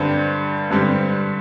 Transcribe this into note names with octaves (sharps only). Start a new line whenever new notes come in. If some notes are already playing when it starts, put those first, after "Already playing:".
Already playing: G2 D3 G3 C4
G2 D3 G3 C4